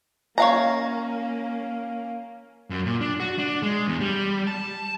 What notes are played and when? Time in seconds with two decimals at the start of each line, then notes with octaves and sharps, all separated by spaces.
0.38 A#3 C#4 C#5 F5 A#5
2.70 F#2
2.86 A#2
3.01 D4
3.20 F#4
3.39 D4
3.63 G#3
3.88 E2
4.01 G3
4.47 A5